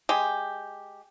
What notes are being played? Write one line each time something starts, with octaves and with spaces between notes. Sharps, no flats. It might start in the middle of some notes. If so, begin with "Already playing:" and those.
G#3 G4